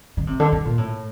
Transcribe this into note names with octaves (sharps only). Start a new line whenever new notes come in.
D3
C3
D3
D3
A#2
A2